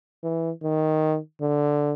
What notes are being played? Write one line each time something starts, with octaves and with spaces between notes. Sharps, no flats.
E3
D#3
D3